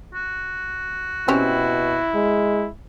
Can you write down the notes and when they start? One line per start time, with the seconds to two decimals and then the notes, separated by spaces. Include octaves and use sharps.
0.14 F#4
1.28 B2 C4 C#4 E4 G4
2.15 G#3